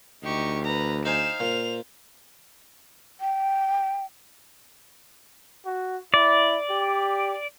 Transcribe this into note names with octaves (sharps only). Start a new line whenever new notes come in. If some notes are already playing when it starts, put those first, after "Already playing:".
D2 D#4 G4 C#6
B4 A#5
D#4 C5 F5 G#5 E7
A#2 C5 F7
G5
F#4
E4 D5
G4